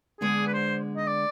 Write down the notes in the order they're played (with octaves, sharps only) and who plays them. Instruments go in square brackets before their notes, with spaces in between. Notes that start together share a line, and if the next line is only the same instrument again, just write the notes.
[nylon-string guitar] D3 G#3 B3 D4 [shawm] G#4
[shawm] B4
C5
D#5
D5